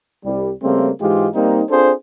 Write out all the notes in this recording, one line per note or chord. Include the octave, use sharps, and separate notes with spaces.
C2 G3
C#3 G3 A3 A#3 C4
G#2 E3 G#3 F4 G4
G3 A#3 C4 D#4
C4 D4 F4 G#4 A4 C5